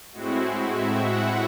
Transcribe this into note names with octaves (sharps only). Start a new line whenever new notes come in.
A2 G#3 C4 E4 F#4
E5
F#5